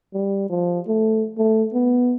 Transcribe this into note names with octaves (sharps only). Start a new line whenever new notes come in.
G3
F3
A3
A3
B3